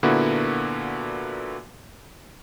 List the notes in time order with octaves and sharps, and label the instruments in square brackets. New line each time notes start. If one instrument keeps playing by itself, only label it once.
[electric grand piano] A#2 D3 A#3 B3 E4 F#4